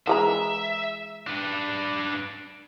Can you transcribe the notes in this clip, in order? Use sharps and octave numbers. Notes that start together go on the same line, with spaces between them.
E3 G#3 E5 A#5
D4 B4